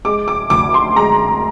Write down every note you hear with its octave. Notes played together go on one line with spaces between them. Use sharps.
G#3 D6
D6
D2 D6
C6
G#3 A#5